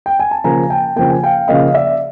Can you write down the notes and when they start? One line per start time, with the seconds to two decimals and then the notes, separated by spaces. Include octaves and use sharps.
0.06 G5
0.20 G#5
0.31 A5
0.44 C#3 F3 A#3 G#5 A#5
0.70 G5 A5
0.96 C#3 F3 A#3 G5
1.10 G#5
1.24 F5 G5
1.48 C#3 F3 A#3 D#5 F5
1.74 D5 E5